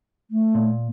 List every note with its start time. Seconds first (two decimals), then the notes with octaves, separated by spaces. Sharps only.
0.31 A3
0.55 A#2